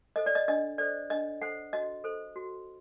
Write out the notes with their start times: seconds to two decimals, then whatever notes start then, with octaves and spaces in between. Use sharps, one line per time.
0.16 A4 C5 D#5
0.26 D5
0.35 D#5
0.48 D4 D#5
0.78 A4 C5 D5
1.10 D4 D#5
1.41 A4 C5 F#5
1.73 F#4 D#5
2.04 A4 C5
2.36 F#4